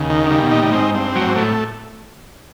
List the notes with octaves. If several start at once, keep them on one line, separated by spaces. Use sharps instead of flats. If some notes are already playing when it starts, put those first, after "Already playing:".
Already playing: D#2 C#3
D#3
D3
C#3 G3
B2
A#2 D#4
A2
G#2 C4
G2 C4
A2 F#3
G#2
A2 A3